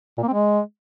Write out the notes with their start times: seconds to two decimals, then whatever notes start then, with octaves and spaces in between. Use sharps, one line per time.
0.18 A#2
0.23 A#3
0.28 C4
0.33 G#3